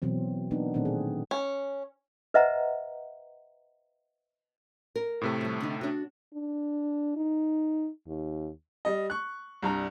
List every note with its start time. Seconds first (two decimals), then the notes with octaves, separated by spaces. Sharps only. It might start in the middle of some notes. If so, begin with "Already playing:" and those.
0.02 B2 E3 F#3 C4
0.51 A#3 B3 D4 D#4
0.74 A#2 D#3 A3 C4 D4
0.85 G#4
1.31 C#4
2.34 B4 C5 D#5 E5 F#5 A#5
4.96 A#4
5.21 A2 C3 A3
5.41 F3 G3
5.60 D3 D#4
5.81 D4 F#4
6.33 D4
7.16 D#4
8.07 D#2
8.85 G3 D#5
9.10 C#6 F#6
9.63 C2 G2 A#5